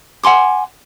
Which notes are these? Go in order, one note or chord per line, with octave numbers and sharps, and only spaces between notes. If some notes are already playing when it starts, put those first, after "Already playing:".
F#5 G#5 C6 D6